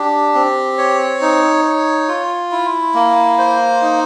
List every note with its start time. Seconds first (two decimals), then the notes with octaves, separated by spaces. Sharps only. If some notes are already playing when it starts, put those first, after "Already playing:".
Already playing: D4 G4
0.35 C4
0.78 C#5
1.21 D#4
1.65 C#5
2.08 F4
2.52 E4
2.94 A#3
3.38 C5
3.82 D#4